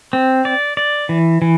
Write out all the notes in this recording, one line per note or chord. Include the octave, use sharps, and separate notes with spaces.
C4
D5
D5
E3
E3